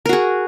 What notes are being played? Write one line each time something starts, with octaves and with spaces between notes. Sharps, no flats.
F#4 G#4 A#4